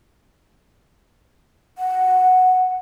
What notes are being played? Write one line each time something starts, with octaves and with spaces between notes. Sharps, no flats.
F#5